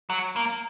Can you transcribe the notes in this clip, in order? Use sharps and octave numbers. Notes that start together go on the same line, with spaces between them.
F#3
A#3